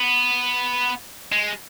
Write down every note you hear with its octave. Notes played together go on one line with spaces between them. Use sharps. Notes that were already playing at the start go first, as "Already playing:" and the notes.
Already playing: B3
G#3